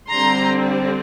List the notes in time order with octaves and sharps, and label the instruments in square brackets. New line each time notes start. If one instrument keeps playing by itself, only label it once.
[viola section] D3 G3 C4 A#5 C6